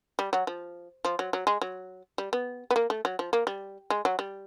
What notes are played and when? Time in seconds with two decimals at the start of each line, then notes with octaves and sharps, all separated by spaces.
0.19 G3
0.33 F#3
0.47 F3
1.05 F3
1.19 F#3
1.33 F#3
1.47 G#3
1.62 F#3
2.18 G3
2.33 B3
2.71 B3
2.76 A#3
2.90 A3
3.05 F#3
3.19 F3
3.33 A#3
3.47 G3
3.90 G#3
4.05 F#3
4.19 G3